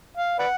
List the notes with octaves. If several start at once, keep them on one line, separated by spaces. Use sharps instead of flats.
F5
B4 D5 F#5